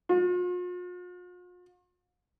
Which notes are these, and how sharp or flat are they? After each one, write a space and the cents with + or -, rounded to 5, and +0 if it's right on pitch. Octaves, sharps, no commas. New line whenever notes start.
F4 +45